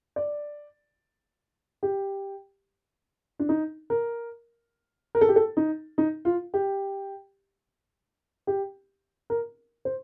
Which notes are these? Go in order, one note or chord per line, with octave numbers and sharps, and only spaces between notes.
D5
G4
D4
D#4
A#4
A#4
A4
G4
A4
D#4
D#4
F4
G4
G4
A#4
C5